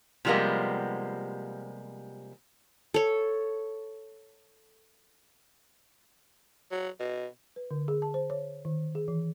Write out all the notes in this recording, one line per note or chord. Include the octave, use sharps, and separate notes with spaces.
C3 F3 G3 G#3 A#3 B3
A4 C#5
F#3
B2
B4
D3
G#4
A5
C5
C#5
D#3
G#4
E3